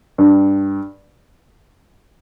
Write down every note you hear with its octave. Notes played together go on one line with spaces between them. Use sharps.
G2